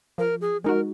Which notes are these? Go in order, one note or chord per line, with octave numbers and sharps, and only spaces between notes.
F3 A#4
G#4
G#3 D#4 F#4 A#4